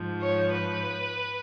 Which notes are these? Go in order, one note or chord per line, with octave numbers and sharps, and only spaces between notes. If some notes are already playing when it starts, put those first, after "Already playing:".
Already playing: G#2 F3
C#5
B4